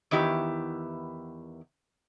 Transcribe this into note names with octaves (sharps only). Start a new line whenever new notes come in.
E2 D#3 B3 E4 G4